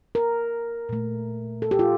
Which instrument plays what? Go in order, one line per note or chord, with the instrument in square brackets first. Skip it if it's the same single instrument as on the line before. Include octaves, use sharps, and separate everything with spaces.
[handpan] A#4
A#2 A3
A4
G4
F4